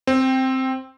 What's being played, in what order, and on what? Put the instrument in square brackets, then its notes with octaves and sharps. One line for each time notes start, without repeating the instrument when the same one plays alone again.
[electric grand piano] C4